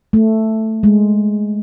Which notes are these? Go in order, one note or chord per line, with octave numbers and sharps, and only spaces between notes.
A3
G#3